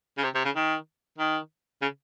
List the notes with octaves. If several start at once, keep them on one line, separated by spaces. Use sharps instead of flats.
C#3
C3
C3
C#3
D#3
D#3
C#3